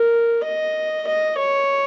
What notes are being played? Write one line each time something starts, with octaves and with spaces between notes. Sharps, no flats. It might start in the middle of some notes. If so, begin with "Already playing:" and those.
Already playing: A#4
D#5
D#5
C#5